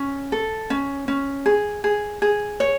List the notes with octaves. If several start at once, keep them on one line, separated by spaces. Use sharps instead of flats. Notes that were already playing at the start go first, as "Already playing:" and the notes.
Already playing: C#4
A4
C#4
C#4
G#4
G#4
G#4
C#5